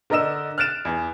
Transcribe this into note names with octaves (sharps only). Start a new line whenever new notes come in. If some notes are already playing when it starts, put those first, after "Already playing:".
D3 A#4 D5 D#5 E6 E7
F6 F#6 A6 D7 E7
E2